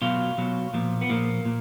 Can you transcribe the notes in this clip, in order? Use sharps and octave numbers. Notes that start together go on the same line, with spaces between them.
B2 F#3 F4
B2 F#3
A#2 F3
B3
A#2 F3 A#3
A#2